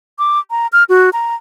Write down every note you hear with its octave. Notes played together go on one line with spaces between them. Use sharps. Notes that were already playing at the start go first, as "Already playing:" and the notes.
D6
A#5
F6
F#4
A#5